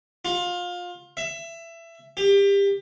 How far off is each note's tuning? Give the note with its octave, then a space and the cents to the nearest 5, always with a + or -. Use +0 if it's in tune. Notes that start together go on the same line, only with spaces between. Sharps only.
F4 +25
E5 +20
G4 +25